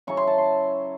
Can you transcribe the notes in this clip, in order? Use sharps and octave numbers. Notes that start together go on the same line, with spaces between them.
C#3 F#3 C#4 E4 C#6
C6
A5
C6